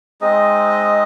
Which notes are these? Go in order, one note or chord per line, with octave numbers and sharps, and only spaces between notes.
G#3 C4 D#4 D#5